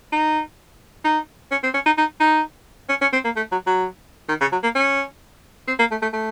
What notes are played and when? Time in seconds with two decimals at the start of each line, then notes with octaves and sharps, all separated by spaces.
0.12 D#4
1.04 D#4
1.51 C#4
1.63 C4
1.74 C#4
1.86 D#4
1.98 D#4
2.20 D#4
2.89 C#4
3.01 C#4
3.13 C4
3.24 A#3
3.36 A3
3.52 F#3
3.66 F#3
4.29 D#3
4.41 C#3
4.52 F#3
4.63 A#3
4.75 C#4
5.67 C4
5.79 A#3
5.91 A3
6.02 A3
6.13 A3